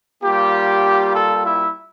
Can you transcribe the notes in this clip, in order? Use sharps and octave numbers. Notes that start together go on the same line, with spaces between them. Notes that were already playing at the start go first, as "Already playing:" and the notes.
G3 A#3 F4 G4
A4
E4 E5